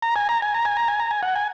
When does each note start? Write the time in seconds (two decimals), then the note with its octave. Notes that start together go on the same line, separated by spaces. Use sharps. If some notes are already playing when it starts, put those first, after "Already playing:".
0.02 A#5
0.16 G#5
0.29 A#5
0.42 G#5
0.54 A#5
0.65 G#5
0.77 A#5
0.88 G#5
1.00 A#5
1.11 G#5
1.23 F#5
1.36 G#5